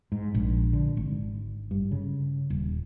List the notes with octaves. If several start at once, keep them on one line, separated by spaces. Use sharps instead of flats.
G#2
A#1
D3
G#1
G2
C#3
D#1